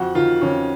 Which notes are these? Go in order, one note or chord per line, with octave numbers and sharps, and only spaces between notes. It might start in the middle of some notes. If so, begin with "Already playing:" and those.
Already playing: F2 F#4
D#3 F4
F2 C#4